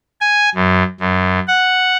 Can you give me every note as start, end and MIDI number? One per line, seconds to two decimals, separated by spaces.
0.21 0.50 80
0.55 0.84 42
1.00 1.40 42
1.47 1.97 78